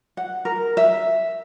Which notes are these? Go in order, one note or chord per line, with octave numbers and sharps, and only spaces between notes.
F#5
A#4
E5